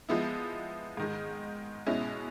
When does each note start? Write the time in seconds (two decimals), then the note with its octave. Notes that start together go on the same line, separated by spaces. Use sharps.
0.09 F3 G#3 B3 E4
0.97 G#2 D#3 G#3
1.86 B2 G#3 C#4 E4